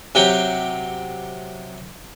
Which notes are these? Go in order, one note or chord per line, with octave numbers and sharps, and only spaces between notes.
C3 F#3 G4 G5